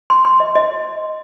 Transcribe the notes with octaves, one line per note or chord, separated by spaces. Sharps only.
C6
C6
D#5
D#5